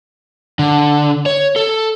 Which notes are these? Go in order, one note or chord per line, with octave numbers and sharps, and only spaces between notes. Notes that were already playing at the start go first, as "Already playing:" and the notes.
D3
C#5
A4